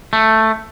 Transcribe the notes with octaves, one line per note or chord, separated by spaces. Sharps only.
A3